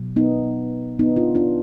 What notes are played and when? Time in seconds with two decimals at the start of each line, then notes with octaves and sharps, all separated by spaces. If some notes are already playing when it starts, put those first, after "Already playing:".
Already playing: B2 F#3
0.16 B3 D#4
0.99 B3 D#4
1.16 D4 F4
1.35 D4 F4